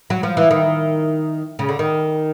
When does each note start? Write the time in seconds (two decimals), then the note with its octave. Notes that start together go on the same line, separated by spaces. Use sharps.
0.10 F#3
0.23 F3
0.37 E3
0.51 D#3
1.59 C#3
1.69 D3
1.79 D#3